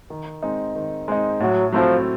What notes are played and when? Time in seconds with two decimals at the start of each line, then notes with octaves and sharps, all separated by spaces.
0.10 D#3
0.42 G#3 C4 D#4
0.75 D#3
1.08 G#3 C4 D#4
1.40 A2 F#3
1.73 F3 F#3 A3 C4 E4